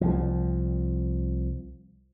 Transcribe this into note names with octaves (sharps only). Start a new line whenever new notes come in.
C2 F3